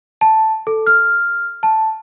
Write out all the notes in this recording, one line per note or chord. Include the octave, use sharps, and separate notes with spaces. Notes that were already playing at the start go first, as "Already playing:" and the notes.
A5
A4
F6
A5